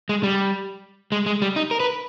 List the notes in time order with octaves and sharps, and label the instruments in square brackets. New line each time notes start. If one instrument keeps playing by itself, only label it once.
[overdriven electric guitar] G#3
G3
G#3
G#3
G3
D#4
A#4
B4